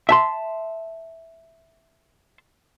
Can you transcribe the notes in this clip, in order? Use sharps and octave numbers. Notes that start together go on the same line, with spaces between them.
E5 A5 C6